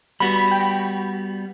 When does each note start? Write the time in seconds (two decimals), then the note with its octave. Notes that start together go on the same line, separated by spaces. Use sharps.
0.20 G3 B3 F#4 B5
0.36 B5
0.51 G5